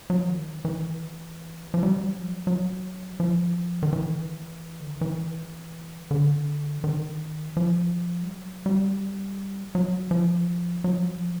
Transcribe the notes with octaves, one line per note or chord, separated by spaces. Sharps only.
F#3
F3
D#3
E3
F3
G3
F#3
G3
F#3
F3
F#3
F#3
F3
D#3
E3
D3
D#3
E3
D3
E3
D#3
F3
G3
F#3
G3
F#3
F3
F#3
F3
F#3
F3